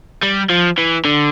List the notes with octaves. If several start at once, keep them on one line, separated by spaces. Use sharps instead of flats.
G3
F3
E3
D3